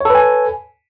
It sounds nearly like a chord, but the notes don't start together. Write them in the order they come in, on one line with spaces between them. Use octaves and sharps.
C#5 A4 B4 G#5